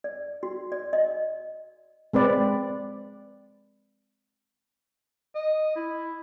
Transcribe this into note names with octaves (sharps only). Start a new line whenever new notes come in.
D5
F#4
D5
D#5
G#3 C4 B4 D5
D#5
E4